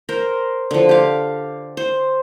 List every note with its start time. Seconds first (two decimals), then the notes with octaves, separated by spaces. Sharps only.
0.09 A#4 C5
0.71 D3 F3
0.89 G4 F5
1.77 C5